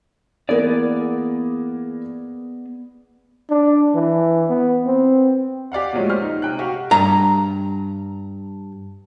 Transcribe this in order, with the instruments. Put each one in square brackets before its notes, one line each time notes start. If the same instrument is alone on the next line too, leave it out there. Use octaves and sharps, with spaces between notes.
[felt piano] E3 A#3 A#4 [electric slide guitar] B3 G#4 D5
[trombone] D4
E3
B3
C4
[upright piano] G4 D5 F5 F#5
A#2 F3 F#3 G#3 A3 C#4
G4 C5 F6
D#4
C3 G5 F#6
F#4 G4 F5
[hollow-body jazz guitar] G2 A#5